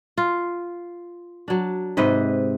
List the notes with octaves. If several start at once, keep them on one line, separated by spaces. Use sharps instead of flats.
F4
F#3 D4
G#2 C3 B4 D#5